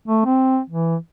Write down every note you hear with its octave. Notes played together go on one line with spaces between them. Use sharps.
A3
C4
E3